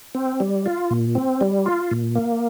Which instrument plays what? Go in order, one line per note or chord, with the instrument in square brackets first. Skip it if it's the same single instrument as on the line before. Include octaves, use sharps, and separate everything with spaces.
[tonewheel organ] C4
G3
F4
A#2
C4
G3
F4
A#2
A#3